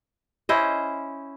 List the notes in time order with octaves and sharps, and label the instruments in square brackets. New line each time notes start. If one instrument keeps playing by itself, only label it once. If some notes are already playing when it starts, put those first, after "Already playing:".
[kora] C#4 E4 C5 D#5